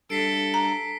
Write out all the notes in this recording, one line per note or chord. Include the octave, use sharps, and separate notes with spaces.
G2 A4 B6 C7 D7
A#5